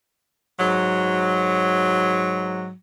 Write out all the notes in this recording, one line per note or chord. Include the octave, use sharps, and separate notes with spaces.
G#2 F#3